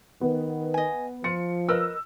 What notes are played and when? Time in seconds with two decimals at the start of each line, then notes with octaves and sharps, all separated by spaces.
0.21 D#3 B3
0.74 D#5 G#5
1.24 F3 F4 C#7
1.69 A#4 B4 D#5 E6